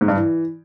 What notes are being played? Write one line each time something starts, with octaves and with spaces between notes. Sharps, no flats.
G#2
G2
E3